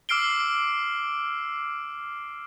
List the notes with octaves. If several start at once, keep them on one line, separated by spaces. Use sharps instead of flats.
D6 E6 F6 C7 D7 G7